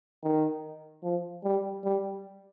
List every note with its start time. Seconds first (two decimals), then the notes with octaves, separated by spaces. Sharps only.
0.23 D#3
1.03 F3
1.44 G3
1.84 G3